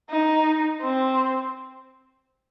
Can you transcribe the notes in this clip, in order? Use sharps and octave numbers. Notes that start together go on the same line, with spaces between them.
D#4
C4